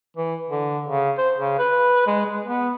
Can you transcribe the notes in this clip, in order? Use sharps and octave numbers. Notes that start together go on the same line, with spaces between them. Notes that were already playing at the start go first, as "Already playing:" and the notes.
E3
D3
C#3
C5
C#3
B4
G#3
G#3
B3